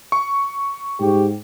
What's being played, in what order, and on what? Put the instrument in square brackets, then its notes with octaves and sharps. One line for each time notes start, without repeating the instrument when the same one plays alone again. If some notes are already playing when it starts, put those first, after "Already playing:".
[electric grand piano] C#6
[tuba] G#2 [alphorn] G4